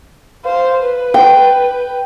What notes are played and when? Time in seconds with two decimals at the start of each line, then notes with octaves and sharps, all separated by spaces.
0.45 C5 F5
0.82 B4
1.14 G5